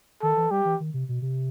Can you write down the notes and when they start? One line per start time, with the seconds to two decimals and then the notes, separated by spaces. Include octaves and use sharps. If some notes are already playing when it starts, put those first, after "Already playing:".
0.22 D#3 A4
0.37 E3
0.51 G3 G4
0.65 E3
0.80 D#3
0.94 C3
1.09 B2
1.22 C3